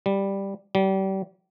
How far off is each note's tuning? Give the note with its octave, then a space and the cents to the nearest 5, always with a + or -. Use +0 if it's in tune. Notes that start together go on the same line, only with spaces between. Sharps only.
G3 +5
G3 -30